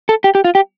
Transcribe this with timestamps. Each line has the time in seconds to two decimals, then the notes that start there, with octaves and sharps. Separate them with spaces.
0.09 A4
0.24 G4
0.35 G4
0.44 F4
0.55 G4